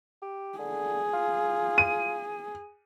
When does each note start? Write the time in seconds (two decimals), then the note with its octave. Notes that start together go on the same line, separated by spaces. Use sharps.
0.22 G4
0.59 D3 G#4
1.14 F4
1.78 D#7